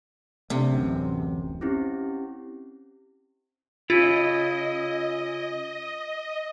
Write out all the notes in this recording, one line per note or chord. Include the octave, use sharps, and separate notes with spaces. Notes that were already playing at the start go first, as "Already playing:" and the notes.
C3 A3 D4
D1 A1 F#2
C4 C#4 E4 G4
C#3 E4 F4 D#5